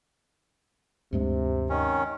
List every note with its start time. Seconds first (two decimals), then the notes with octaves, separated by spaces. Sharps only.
1.13 D2 G2 C3 G#3
1.70 D#3 C#4